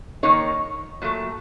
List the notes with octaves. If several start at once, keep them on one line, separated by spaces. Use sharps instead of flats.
D#3 F#3 A#3 D#4 C#5
A#2 F#3 A3